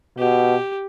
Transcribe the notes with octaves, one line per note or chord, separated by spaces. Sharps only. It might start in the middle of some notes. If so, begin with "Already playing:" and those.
B2 G4